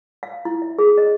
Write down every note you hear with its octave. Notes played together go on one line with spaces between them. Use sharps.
F5
E4
E5
G#4
D#5